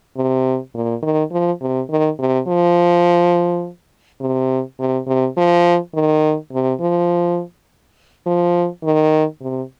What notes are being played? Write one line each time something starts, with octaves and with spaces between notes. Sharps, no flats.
C3
A#2
D#3
F3
C3
D#3
C3
F3
C3
C3
C3
F3
D#3
C3
F3
F3
D#3
C3